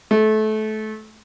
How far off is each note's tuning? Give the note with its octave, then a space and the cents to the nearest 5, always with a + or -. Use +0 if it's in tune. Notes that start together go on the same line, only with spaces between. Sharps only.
A3 -25